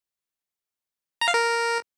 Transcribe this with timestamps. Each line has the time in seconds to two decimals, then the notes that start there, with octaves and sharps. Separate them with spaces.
1.21 A#5
1.28 F5
1.34 A#4